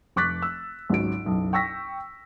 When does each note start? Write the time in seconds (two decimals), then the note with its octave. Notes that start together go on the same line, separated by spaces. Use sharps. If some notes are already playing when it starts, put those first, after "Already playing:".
0.16 F1 C#6 D6 F#6 A6 B6
0.42 E6
0.90 G#1 C#2 F#3 D7
1.24 F#1 B1
1.53 G5 C#6 E6 A#6 B6